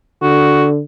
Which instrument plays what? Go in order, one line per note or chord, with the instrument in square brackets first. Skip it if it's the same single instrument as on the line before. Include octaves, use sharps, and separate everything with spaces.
[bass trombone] D3 [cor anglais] F#4